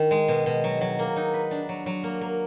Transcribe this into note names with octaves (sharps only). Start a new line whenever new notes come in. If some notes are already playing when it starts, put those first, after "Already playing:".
Already playing: D#3
G#3
B2
B2
F#3
F#3
A#3
D#4
B4
D4
F#3
F#3
A#3
A#3